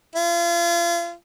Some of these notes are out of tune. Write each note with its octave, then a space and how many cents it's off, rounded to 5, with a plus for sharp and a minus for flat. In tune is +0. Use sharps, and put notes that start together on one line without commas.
F4 -35